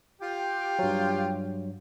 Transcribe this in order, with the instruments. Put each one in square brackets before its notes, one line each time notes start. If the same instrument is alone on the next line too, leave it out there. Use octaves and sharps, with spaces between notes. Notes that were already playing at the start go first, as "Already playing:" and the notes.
[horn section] F4 G4 G5
[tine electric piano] G2 F#3